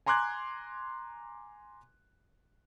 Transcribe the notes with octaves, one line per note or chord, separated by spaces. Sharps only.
G#5 A#5 C6 D6 F#6 G#6